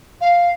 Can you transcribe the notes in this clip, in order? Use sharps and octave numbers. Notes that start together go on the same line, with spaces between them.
F5